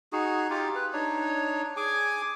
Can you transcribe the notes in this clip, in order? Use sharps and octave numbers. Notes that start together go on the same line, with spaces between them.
D#4 F#4 G#4
D#4 F4 G4
B4
D4 D#4 C#5
G#4 G#5 D6